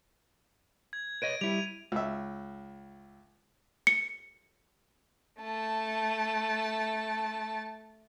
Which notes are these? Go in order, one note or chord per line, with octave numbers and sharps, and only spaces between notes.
G#6
B4 C#5 D#5 D7 D#7
G3 E4 F7
C#2 E5
C#7
A3 A5